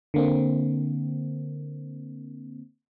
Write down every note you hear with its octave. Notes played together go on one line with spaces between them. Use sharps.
D3 A#3 C4